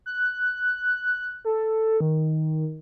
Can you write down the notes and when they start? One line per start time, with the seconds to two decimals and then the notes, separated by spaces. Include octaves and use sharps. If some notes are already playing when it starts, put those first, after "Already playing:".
0.06 F#6
1.45 A4
2.01 D#3